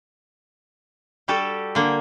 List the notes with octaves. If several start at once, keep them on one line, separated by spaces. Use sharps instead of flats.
G3 F#4 G4 A4
D3 A#3